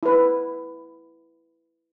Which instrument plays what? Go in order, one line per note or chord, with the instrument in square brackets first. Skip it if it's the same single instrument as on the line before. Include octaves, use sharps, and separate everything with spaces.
[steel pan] E4 B4